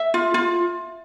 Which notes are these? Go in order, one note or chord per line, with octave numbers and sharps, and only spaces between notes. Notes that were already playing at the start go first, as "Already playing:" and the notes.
Already playing: E5
F4
F4